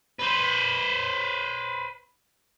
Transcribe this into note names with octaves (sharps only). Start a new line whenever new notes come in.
B4 C5